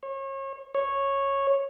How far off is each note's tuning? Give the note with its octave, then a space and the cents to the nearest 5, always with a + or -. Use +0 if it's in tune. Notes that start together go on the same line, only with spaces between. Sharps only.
C#5 -35
C#5 -10